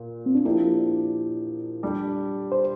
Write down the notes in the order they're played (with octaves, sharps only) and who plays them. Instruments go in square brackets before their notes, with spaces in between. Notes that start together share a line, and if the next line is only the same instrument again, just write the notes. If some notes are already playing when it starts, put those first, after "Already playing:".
Already playing: [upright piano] A#2
[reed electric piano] C4
D4
[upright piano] F3 A#3 D4 G4 [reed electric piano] E4
[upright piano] G3 D4 G4
[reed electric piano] C5